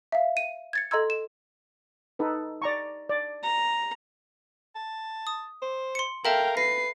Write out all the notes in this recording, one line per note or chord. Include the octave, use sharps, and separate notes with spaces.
E5 F5
D#7
G#6 A6 C#7
A4 D#5 A#5 C6 E6 G#6
E7
D#4 A4 B4
D5 A#5 C#6
D5
A#5
A5
D#6
C5
C6 C#7
A4 A#4 E5 F5 G5 A5
B4 A#6 C7